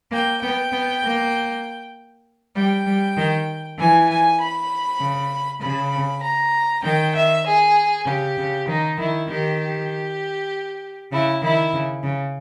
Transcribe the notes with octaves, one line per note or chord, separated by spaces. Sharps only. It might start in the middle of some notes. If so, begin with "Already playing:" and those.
A#3 G5
B3 G5
B3
A#3
G3 G5
G3
D#3
E3 G#5
G#5
B5
C#3
C#3 B5
A#5
D#3 G5
E5
G#4
C#3 G4
C#3
D#3 D#4
D#3 E4
D#3 G4
G4
C#3 E4
D#3 E4
C#3
C#3